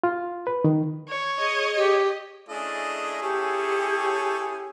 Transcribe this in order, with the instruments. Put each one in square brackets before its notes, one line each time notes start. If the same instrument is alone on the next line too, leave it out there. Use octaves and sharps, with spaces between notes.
[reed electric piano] F4
B4
D#3
[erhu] C#5
[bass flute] G#4 [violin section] D#5
[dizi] G4
[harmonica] A3 D4 D#5 [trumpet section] C#4 E4 G#4
[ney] G4 [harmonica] A4 C#5 G#5